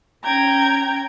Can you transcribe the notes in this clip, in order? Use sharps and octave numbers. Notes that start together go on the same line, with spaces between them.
C#4 G5 A#5 G#6